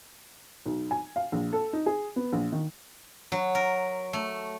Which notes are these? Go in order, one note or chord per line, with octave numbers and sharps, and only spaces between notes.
B1
G#5
F5
A#1
A4
D#4
G#4
B3
A#1
D#3
F#3
A#4
A3